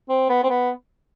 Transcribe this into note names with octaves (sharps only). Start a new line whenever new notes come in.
C4
B3
C4
B3